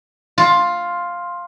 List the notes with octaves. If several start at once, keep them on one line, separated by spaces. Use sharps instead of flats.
F4